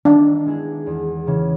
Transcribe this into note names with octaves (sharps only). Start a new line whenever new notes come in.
D#3 D4
G#3 B3 E4 G#4
E2
C#3 E3